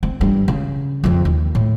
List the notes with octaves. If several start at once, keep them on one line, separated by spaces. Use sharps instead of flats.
C4
G2 E3
C#3
F2 C#3
D#2
A2